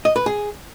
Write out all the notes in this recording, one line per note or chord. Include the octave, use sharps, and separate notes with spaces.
D#5
B4
G#4